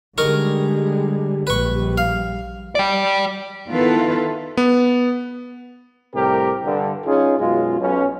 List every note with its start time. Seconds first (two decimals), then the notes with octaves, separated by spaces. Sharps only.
0.18 D3 G3 G#3 D#4 A#4 C#6
1.47 A#1 G3 B4 C#6
1.98 F5
2.75 D5 G5
3.69 D#3 B3 E4 F4 A4 B4
4.57 B3
6.15 C2 A2 C3 G3 G4 A#4
6.64 G2 D3
7.05 C#4 D#4 F4 G#4
7.38 F#2 B2 G#3 F4
7.80 B1 B2 C#4